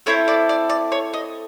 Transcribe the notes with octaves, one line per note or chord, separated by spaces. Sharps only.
C4 E4 A4 C#5
D5
D5
D5
C#5
D#5